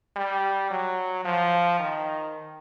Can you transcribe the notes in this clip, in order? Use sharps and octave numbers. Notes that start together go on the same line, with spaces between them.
G3
F#3
F3
D#3